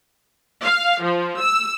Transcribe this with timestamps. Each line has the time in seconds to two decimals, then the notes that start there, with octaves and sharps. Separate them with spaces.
0.62 F5
1.01 F3
1.40 E6